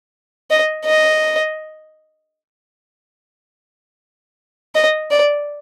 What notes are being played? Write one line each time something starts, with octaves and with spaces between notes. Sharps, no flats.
D#5
D#5
D#5
D5